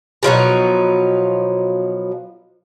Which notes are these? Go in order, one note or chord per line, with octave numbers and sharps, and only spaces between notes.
B2 F3 F#3 D#4